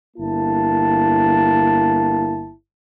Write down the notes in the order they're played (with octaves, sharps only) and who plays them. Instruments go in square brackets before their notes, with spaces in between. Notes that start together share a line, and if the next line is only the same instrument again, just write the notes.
[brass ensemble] G1 A#3 E4 A5